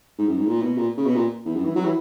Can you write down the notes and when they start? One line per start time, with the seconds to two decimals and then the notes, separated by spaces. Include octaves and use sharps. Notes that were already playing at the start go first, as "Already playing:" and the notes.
0.18 G#2
0.28 F#2
0.39 G#2
0.48 A#2
0.62 B2
0.78 A#2
0.97 C#3
1.06 B2
1.16 A#2
1.45 E2
1.56 F#2
1.65 E3
1.75 F#3
1.85 E3